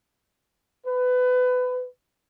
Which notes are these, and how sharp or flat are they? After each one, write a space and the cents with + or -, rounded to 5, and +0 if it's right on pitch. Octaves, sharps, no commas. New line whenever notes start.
B4 +25